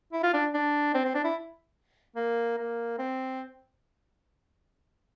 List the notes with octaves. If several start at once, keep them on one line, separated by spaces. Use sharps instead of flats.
E4
F4
D4
D4
C4
C4
D4
E4
A#3
A#3
C4